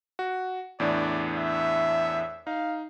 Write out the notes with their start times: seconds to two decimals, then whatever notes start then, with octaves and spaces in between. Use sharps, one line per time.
0.19 F#4
0.80 E2 A2 D4 D5
1.37 E5
2.47 D#4 F5